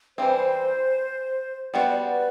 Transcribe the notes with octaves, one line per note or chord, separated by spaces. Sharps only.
E3 G3 C4 C5
G3 B3 F#4 C5 D5
D5
B4 D5